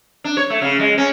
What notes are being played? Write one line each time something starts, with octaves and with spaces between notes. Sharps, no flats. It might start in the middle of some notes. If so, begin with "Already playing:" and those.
D4
C#5
A3
C#3
G#3
C#4